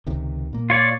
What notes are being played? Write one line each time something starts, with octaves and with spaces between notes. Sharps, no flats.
C#2 C3 D#3
A#2 A#3
F4 C#5 D5